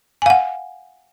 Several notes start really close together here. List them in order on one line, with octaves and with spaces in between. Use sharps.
G#5 F5 F#5